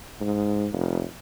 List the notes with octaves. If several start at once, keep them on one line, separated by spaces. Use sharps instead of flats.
G#2
F1